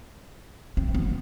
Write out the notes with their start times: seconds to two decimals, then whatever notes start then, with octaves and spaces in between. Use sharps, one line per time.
0.77 C4
0.95 B3